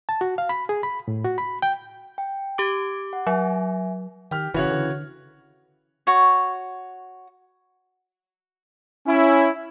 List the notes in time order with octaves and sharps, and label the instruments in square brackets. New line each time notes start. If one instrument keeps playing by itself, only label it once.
[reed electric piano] A5
F#4
F5
B5
G#4
B5
A2
F#4
B5
G5
[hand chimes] G5
[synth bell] G4 D6 [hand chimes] G#6 D7
[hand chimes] F#5
[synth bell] F#3 [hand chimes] E5 G#5
[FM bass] D#3 [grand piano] G4 F6
[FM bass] F1 [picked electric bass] C#3 E3 [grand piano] F#4 C#5 F#5
[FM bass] D3
[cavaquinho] F#4 C#5
[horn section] C#4 E4